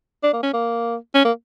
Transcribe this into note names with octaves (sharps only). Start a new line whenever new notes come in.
D4
A#3
C#4
A#3
C#4
A#3